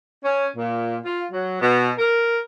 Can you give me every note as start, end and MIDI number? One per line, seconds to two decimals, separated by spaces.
0.23 0.46 61
0.55 0.97 46
1.03 1.24 65
1.31 1.58 54
1.60 1.90 47
1.98 2.39 70